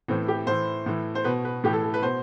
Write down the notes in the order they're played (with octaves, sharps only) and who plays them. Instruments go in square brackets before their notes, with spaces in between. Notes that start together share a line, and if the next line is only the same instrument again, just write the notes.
[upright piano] A2 E3 C4
G4
A2 E3 C5
A2 E3
C5
B2 B4
B4
A2 E3 G4
A4
A4
B4
B2 C5